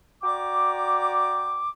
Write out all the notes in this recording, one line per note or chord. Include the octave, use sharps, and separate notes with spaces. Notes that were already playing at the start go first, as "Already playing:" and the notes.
F#4 D5 G5 A#5 D6